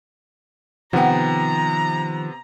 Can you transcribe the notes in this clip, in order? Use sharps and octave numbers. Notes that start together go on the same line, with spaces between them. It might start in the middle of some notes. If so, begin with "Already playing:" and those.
C3 D#3 F3 B3 F#5 G5 A#5